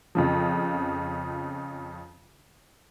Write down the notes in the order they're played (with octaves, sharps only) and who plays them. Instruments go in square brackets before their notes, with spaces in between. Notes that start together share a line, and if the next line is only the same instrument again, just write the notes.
[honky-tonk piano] F2 C#3 F3